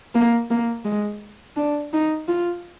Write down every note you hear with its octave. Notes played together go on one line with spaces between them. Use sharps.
A#3
A#3
G#3
D4
D#4
F4